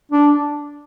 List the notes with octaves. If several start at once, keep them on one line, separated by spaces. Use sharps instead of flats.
D4